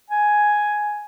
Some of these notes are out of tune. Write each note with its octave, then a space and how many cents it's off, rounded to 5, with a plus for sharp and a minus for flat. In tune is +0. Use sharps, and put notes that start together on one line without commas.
G#5 +5